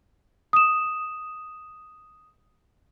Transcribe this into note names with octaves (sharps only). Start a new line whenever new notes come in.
D#6 E7